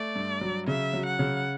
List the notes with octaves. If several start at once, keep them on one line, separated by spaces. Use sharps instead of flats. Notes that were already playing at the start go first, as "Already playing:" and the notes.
Already playing: A3 D5
G2
F#3
C#3 E5
F#3
F#5
C#3